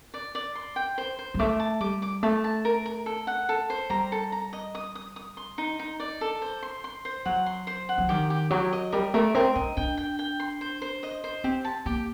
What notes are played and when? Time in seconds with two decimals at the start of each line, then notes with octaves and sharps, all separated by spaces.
0.14 D5
0.35 D5
0.55 C6
0.76 G5
0.98 C5
1.19 C5
1.34 G3
1.39 A3 D6
1.60 A5
1.80 G3 D6
2.02 D6
2.23 A3 A5
2.44 A5
2.65 A#4
2.86 A#4
3.06 A4
3.27 F#5
3.49 A4
3.70 C5
3.90 G3 A#5
4.12 A4
4.32 A#5
4.53 D#5
4.75 D#6
4.95 D#6
5.16 D#6
5.37 C6
5.58 D#4
5.79 D#4
6.00 D5
6.21 A4
6.42 C5
6.63 C6
6.84 C6
7.05 C5
7.25 F#3 F#5
7.46 C6
7.67 C5
7.89 F#5
7.98 F#3
8.09 D#3 G4
8.30 G4
8.50 F#3 G4
8.73 D#5
8.92 G3 A#4
9.14 A3 A#4
9.35 C4 A#4
9.55 D4 D#5
9.77 D4 G5
9.97 G5
10.19 G5
10.40 C6
10.61 C5
10.82 C5
11.03 D#5
11.24 C5
11.44 C4 G4
11.65 A5
11.86 A#3 G4